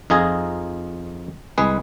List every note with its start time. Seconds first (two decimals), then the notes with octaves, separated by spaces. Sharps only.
0.10 F2 D#4 F4 G#4 G#5 A#5
1.58 C2 G#3 G#4 B4